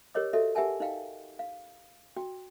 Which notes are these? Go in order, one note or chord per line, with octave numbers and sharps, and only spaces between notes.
G4 A#4 C#5 D#5 D6
F#4 A4 D#5 E5
G4 A#4 E5 F#5 G#5 A5
D#4 D#5 F5 G5
F5
F#4 G5